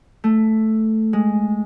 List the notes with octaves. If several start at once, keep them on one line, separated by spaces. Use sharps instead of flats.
A3
G#3